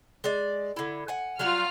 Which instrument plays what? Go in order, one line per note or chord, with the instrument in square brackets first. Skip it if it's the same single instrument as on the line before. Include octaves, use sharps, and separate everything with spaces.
[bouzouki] G#3 D5
D3 E4
F#5 G#5
[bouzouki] F#3 G3 F#4 [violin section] F4 F6